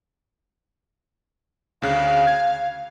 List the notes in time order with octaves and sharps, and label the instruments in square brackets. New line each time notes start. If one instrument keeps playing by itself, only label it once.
[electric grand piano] D2 C#3 F#6 [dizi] F5
[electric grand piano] G#6